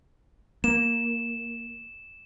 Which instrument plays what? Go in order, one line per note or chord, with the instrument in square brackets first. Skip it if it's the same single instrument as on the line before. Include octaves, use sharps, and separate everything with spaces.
[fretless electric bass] A#3 [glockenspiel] E7